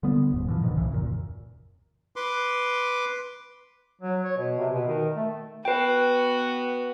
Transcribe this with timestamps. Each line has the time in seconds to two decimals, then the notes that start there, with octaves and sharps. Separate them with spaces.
0.03 D3 G3 B3
0.32 D#1 G#2
0.47 A#2 E3 F3
0.63 G#2 B2 D3 D#3
0.76 C2 C#3 E3
0.92 D#1 F#2 A#2
2.16 B4 C6 D6
4.02 F#3
4.24 C#5
4.37 B2
4.59 C3
4.74 B2
4.88 D#3
5.16 A3
5.65 B3 F#4 B4 G5